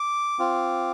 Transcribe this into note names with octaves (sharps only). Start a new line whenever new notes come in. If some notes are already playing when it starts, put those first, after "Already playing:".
Already playing: D6
C4 F4